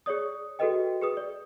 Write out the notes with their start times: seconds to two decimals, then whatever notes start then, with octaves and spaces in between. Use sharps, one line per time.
0.06 G#4 C#5 D5 D#6
0.59 F#4 G#4 A4 B4 D#5 G5
1.01 G#4 B4 D#6
1.17 D5